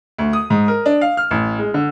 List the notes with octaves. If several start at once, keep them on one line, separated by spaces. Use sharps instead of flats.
D2
D#6
G#2
A#4
D4
F5
F6
A1
G#3
D3